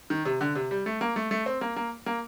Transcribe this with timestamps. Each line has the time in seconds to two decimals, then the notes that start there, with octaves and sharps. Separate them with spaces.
0.10 D#3
0.25 C3
0.41 D3
0.55 C3
0.71 G3
0.86 A3
1.01 A#3
1.16 A3
1.31 A3
1.46 C4
1.61 A#3
1.76 A#3
2.06 A#3